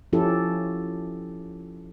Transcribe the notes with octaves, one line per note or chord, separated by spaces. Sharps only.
F3 C#4 E4 G4 A4